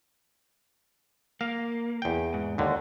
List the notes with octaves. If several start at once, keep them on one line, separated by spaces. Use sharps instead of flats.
A#3 F5
E2 G5
G#2
D#2 D3